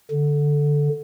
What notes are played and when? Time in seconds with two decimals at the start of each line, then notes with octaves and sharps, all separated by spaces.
0.10 D3